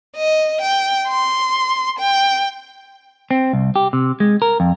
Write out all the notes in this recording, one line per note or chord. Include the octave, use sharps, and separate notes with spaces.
D#5
G5
C6
G5
C4
C2
G4
C3
G#3
A#4
F2